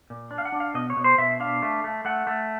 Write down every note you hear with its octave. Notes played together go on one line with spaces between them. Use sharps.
A#2
D4
F5
F#5
D4
F5
B2 D#5
C#5
B2
C5
B2 E5
D4 F5
A3
A3
A3 F#5
A3